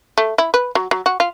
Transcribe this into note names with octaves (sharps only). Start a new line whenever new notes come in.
A3
E4
B4
F#3
F#3
F#4
F4